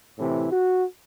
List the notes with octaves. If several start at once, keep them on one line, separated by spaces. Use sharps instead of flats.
A2 C3 E3 E4
F#4